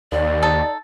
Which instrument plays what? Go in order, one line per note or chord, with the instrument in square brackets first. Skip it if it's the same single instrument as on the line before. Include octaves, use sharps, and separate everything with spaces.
[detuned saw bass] D#2 [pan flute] D5
[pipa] D#4 A4